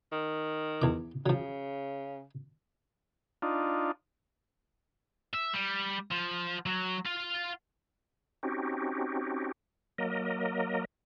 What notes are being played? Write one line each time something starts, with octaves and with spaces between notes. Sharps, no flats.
D#3
E2 D6
C#3 F3 F#3
D4 D#4 F4
E5
G3
F3
F#3
F4
C4 C#4 D#4 F#4 G4
F#3 A#3 A#4 D#5